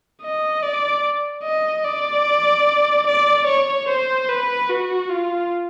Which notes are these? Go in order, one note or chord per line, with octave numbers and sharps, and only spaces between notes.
D#5
D5
D#5
D5
D5
C#5
C5
B4
F#4
F4